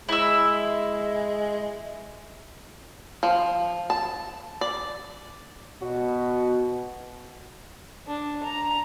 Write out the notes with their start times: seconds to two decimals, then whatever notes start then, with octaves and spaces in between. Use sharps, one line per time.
0.09 G#3 E4 E6
3.23 F3
3.90 A5
4.61 D5
5.82 B2 F#4
8.07 D4
8.43 A#5